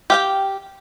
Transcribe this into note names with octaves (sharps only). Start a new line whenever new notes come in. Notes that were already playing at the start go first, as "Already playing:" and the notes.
G4 F5 G5